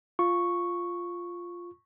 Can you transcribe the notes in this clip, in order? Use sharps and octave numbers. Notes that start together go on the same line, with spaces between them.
F4 C#6